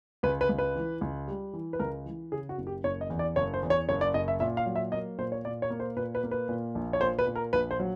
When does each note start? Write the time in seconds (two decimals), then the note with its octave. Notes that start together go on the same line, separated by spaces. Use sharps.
0.23 C#2 B4
0.41 B4
0.49 C#2
0.58 B4
0.76 E3
1.01 C#2
1.28 G3
1.53 E3
1.73 B4
1.80 C#2 A#4
2.06 E3
2.32 C#3 G#4
2.49 F#4
2.58 F#1
2.67 G4
2.84 F#1 C#5
3.01 D#5
3.10 E2
3.19 D5
3.36 F#1 C#5
3.54 C5
3.63 E2
3.70 C#5
3.89 F#1 C#5
4.01 D5
4.14 F#1 D#5
4.28 E5
4.40 A#2 E5
4.57 F5
4.66 F#3
4.76 E5
4.92 A#3 D#5
5.19 A#2 C5
5.32 C#5
5.45 A#2 D5
5.62 C#5
5.70 A#3
5.80 C5
5.97 A#2 B4
6.15 B4
6.23 A#3
6.31 B4
6.49 A#2
6.75 A#1
6.93 C#5
7.01 A#2 C5
7.19 B4
7.27 A#2
7.35 A#4
7.53 A#1 B4
7.71 C5
7.80 F#3